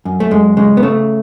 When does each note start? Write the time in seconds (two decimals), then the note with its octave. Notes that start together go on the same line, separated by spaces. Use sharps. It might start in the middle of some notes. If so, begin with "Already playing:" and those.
0.05 F#2
0.20 A3
0.31 F#2 G#3
0.57 C#3 G#3
0.77 B3
0.83 C#3 A3